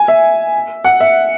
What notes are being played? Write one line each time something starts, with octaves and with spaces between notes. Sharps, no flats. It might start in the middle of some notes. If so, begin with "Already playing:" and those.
Already playing: G#5
E5
F#5
E5